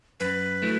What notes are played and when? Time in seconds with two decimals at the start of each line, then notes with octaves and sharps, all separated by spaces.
0.20 F#2 B4
0.62 F#3 A3 E4